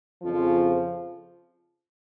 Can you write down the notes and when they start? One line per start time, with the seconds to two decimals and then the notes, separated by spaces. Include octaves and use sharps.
0.23 F2 C#3 F3